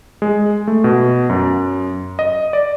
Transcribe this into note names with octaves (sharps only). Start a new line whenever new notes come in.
G#3
A3
B2
F#2
D#5
D5